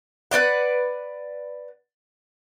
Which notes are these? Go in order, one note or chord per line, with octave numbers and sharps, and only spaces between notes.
B4 C5 D5 F#5